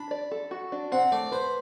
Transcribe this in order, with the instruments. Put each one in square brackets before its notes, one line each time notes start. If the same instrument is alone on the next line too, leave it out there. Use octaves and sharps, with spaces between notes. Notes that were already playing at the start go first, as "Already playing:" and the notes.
Already playing: [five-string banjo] D4 [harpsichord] B5
[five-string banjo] D5
A4
F#4
D4
[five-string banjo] C4 [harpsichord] F#5
[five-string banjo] A3 [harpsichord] D5
[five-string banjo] B4 [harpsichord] C5